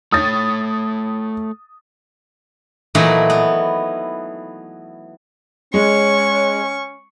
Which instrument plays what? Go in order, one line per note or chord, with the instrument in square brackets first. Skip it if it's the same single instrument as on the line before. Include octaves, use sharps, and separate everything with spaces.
[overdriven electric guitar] A3 C#5 [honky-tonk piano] D#6 A6
[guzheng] A#2 E3 F#3 A3 D#4 E4
B3
[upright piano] G#3 [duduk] C#4 [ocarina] C#5 [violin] C#6